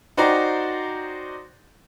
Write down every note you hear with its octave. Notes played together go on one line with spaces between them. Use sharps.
D#4 F#4 C5 D5 G5 A#5